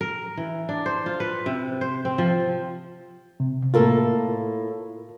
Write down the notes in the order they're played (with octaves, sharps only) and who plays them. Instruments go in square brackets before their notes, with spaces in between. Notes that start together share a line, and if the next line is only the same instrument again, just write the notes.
[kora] A#4
E3
D4
C5
F4
B4
C3
C5
C4
F3
[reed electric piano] C3
[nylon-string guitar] A2 A#3 A4 [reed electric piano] F4 A#4